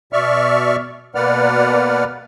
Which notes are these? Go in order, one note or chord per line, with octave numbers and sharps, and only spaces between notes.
B2 D5 E5 C#6 F6
B2 A#3 B4 D5 F#5 F6